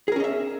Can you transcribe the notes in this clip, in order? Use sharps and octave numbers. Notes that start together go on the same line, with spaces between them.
C#4 G#4 A#4 D#5 E5